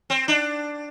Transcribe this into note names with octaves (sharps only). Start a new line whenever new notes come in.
C4
D4